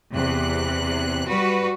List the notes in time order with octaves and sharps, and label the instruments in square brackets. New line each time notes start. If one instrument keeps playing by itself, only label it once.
[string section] E2 C3 F#6
G3 F#4 B4